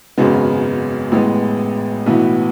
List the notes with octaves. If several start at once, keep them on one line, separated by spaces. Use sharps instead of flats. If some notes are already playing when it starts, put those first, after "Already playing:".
G#1 F#2 C#3 G#3 B3
A1 A2 G#3 B3
B1 A2 E3 B3 F#4